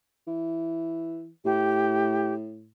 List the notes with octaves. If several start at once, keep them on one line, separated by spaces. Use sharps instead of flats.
E3
A2 G4